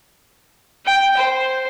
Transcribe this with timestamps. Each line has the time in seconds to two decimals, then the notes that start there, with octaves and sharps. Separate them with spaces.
0.86 G5
1.17 C5